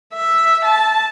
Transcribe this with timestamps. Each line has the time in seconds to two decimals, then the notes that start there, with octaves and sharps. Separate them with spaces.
0.14 E5
0.65 A5